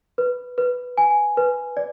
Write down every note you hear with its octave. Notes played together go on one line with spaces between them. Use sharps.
B4
B4
G#5
B4
D5